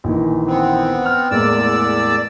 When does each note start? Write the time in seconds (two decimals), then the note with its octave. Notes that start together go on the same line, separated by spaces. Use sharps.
0.04 A#1 D#3 E3
0.47 B3 C4
1.06 F6
1.31 E2 A2 G#3 A#3 D5 E6